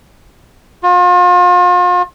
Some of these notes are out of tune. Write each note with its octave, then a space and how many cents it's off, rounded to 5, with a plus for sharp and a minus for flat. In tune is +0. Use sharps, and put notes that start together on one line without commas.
F4 +40